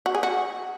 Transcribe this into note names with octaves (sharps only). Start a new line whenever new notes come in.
F#4
G#4
F#4